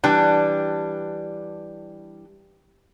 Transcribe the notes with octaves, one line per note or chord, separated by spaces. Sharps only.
E3 G3 D4 B4 G5